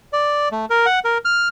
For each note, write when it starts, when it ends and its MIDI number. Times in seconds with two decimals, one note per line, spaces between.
0.13 0.49 74
0.52 0.65 57
0.70 0.86 70
0.86 0.99 78
1.05 1.18 70
1.25 1.48 89